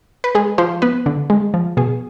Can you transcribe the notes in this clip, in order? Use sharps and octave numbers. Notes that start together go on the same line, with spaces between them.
B4
G#3 G#4
F3 C5
B3 B4
D3
G#3
F3
B2 G#4